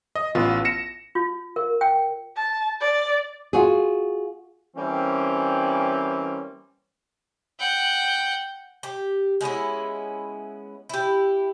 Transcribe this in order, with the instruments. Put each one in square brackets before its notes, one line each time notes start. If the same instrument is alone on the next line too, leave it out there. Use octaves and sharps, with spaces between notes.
[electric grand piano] D#5
A1 B3 F4
A#6 C#7 E7
[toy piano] F4
A#4
G5
[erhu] A5
D5
[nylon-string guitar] F4 F#4 G#4
[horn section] E3 G3 A#3 C4 C#4
[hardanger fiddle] F#5 G5
[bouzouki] G4
G#3 B3 C#4 E4
E4 G4